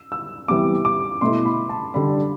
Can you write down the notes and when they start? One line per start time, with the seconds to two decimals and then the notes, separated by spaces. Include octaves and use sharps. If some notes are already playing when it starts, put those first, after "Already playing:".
Already playing: E6
0.12 E6
0.48 C3 E3 G3 B3 D6
0.85 D6
1.21 B2 A3 E4 C6
1.45 B5
1.69 A5
1.94 D3 G3 D4 B5